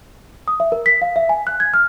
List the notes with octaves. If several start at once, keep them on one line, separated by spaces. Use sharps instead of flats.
D#6
E5
A#4
B6
F5
E5
G#5
F#6
G#6
F6